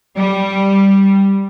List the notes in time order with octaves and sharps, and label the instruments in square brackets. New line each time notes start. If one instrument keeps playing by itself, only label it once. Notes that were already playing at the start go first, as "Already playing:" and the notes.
[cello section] G3